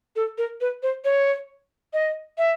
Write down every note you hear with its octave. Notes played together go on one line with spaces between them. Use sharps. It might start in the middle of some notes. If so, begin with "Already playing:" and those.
A4
A#4
B4
C5
C#5
D#5
E5